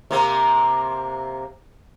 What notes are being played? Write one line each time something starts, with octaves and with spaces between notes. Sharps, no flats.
C3 A#3 C4